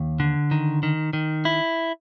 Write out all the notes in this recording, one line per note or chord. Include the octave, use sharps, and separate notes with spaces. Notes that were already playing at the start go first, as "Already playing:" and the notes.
Already playing: D#2
D3
D#3
D#3
D#3
E4